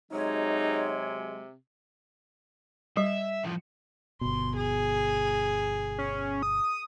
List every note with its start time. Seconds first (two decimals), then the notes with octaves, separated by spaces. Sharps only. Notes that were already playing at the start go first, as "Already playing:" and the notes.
0.12 C3 F#3 G#3 D#4 C#5
2.97 G3 E5
3.45 A2 F3
4.21 G1 B2 C6
4.57 G#4
5.98 C#4
6.43 D#6